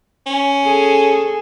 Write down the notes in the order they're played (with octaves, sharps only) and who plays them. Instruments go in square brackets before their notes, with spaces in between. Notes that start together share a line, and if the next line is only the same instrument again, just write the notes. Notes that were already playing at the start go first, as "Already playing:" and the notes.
[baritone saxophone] C#4
[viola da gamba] G#4 A4